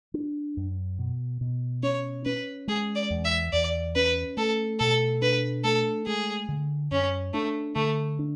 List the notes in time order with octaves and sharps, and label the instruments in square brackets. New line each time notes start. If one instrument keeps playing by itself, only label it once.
[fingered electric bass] D4
F#2
B2
B2
[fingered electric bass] C#4 [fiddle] C#5
[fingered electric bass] C#4 [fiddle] B4
[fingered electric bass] G#3 [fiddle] G#4
[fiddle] D5
[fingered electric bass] E2
[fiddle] E5
[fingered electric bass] E2 [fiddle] D5
[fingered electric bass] C#4 [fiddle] B4
[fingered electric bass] A3 [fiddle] A4
[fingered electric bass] B2 [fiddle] A4
[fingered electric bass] D4 [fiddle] B4
[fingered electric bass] A3 [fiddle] A4
[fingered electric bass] G#3 [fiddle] G#4
[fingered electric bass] D3
[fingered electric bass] F#2 [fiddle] C#4
[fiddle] A3 [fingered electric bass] D4
[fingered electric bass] D3 [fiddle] A3
[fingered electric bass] D4